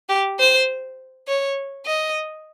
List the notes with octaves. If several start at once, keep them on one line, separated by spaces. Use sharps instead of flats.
G4
C5
C#5
D#5